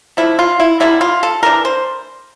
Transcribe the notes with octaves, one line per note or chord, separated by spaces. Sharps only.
F3 A3 D4 E4
F4
E4
D3 G3 A#3 E4
F4
A4
E3 A3 D4 A#4
C5